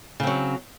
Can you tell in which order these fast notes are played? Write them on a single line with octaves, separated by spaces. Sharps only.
C#3 C4 F#3